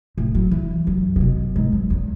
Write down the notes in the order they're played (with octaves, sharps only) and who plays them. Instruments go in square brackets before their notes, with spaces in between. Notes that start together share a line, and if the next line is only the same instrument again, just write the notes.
[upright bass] A2
F#3
E3
F#2
C#3
B2
G#2
F#2
E2